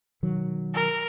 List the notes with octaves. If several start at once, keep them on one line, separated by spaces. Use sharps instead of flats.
B2 D#3 F#3
A#4